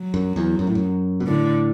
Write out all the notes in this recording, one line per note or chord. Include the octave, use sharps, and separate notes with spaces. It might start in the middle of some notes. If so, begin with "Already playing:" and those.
Already playing: F#3
F#2
E2
F#2
A2
F#2
B2
A2 D3